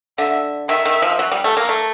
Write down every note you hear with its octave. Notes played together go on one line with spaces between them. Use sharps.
D3 E5
D#3 E5
D#3
F3
F#3
G3
A3
A#3
A3